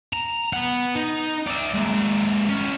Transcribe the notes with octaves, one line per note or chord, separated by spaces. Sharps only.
A#5
B3 F#5
D#4
D5 E5
G#3 A#3
C#4 E4